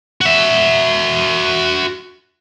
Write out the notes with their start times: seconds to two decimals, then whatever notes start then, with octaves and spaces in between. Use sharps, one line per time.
0.21 F#4 E5